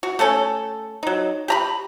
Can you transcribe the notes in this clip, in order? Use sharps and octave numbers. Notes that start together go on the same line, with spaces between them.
F#4
A3 C#4 A4 C#5
F#3 D#4
G4 A#5 B5